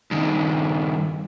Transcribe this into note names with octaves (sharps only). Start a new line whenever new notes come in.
G2 D#3